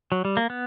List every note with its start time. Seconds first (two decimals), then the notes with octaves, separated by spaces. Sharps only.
0.12 F#3
0.25 G3
0.37 A#3
0.50 B3